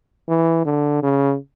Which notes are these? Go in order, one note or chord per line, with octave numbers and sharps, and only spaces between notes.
E3
D3
C#3